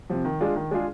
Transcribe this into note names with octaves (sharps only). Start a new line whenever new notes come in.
C3 F3
D#3
G#3 D4 F4 G#4
D#3
G#3 D4 F4 G#4